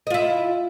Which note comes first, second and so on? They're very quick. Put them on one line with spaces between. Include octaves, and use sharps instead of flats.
D#5 F4 E4